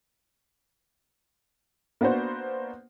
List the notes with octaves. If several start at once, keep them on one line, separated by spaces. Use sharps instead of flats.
A#3 B3 D4 F#4 C5